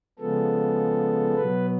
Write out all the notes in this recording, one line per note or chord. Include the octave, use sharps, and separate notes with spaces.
C#3 F3 G#3 B3 A4
B2 F#3 B3 B4